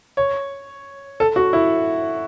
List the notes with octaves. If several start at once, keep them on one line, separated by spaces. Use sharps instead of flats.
C#5
A4
F#4
E4